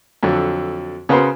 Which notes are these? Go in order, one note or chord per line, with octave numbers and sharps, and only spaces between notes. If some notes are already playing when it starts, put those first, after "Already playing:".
F2 D3 F#3
C#3 B3 F#4 A#4 C5